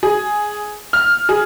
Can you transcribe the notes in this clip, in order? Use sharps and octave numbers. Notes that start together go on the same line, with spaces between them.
G#4
F6
G#4